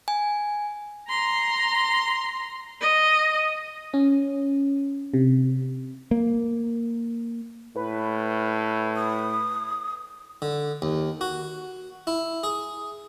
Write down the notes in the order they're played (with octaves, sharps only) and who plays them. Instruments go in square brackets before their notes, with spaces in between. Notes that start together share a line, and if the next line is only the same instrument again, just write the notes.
[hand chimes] G#5
[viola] A#5 C6
D#5
[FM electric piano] C#4
C3
[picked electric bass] A#3
[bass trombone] A2 [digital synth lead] B4
[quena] D#6
[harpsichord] D3
D#2
F#4
E4
G#4